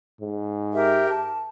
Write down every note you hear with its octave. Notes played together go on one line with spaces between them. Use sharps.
G#2
G4 A#4 E5
A5